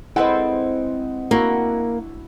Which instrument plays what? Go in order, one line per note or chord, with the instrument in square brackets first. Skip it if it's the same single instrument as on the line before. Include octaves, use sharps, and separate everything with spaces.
[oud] G#3 C4 B4 [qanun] E4 A4 C5 [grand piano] D#5 F#5
[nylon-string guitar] A#3 [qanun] D4 E4 F#4